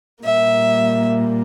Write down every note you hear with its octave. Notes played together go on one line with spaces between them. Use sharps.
A#2 G3 A#3 E5